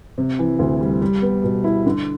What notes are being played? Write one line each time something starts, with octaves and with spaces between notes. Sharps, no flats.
C3
E3
D2
G3
G3
B3
B2
E4
D3